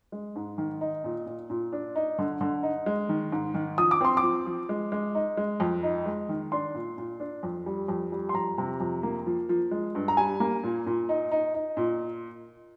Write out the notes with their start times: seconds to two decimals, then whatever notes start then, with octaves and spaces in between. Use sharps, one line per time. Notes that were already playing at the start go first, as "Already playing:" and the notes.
0.12 G#3
0.35 G#2
0.58 D#3
0.81 D#4
1.04 A#2
1.26 A#2
1.50 A#2
1.73 D4
1.96 D#4
2.19 D3
2.41 D3
2.63 D#4
2.86 G#3
3.09 D#3
3.32 G#2
3.54 D#3
3.78 F3 D#6
3.91 D6
4.01 C4 C6
4.17 D6
4.23 F3
4.46 F3
4.69 G#3
4.92 G#3
5.15 D#4
5.37 G#3
5.60 F2
5.83 D#4
6.06 G#3
6.29 D#3
6.52 D4 C6
6.74 A#2
6.98 A#2
7.20 D4
7.43 F2
7.66 G3
7.88 F2
8.12 G3
8.29 C6
8.34 F2 A#5
8.58 C3
8.80 F2
9.03 A#3
9.26 F3
9.49 F3
9.71 G#3
9.95 G2
10.08 A#5
10.17 G3 G#5
10.40 A#3
10.63 A#2
10.86 A#2
11.09 D#4
11.32 D#4
11.54 D#4
11.77 A#2